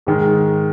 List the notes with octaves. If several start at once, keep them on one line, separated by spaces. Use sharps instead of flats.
G#2 D#3 G#3